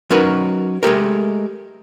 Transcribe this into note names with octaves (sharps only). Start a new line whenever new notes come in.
F#3 C#4 D#4 F#4 A#4 B4
G#3 A3 G4 A#4